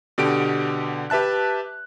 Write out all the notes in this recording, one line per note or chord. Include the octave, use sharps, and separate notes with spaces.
B2 D3 G4 D7
G4 B4 E5 A5 F#6